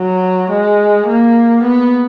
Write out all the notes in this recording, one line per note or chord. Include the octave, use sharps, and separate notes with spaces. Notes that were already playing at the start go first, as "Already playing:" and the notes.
Already playing: F#3
G#3
A#3
B3